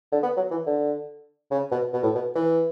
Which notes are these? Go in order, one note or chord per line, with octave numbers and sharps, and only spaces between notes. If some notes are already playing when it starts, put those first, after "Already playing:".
D3
B3
F#3
E3
D3
C#3
B2
B2
A2
B2
E3